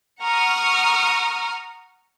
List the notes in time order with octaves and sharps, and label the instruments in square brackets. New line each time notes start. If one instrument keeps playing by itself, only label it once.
[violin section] F#5 A#5 C#6 D#6 F6